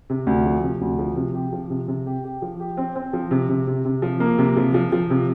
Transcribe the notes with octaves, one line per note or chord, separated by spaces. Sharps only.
C3
D2
F3
C3
D2
F3
C3
G4
F3
C3
C3
G4
G4
F3
G4
C4
C4
F3
C3
C3
C3
C3
F3
A#3
C3
F3
F3
F3
C3